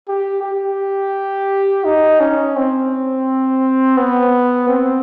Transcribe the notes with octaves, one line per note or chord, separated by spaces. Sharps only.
G4
G4
D#4
C#4
C4
B3
C4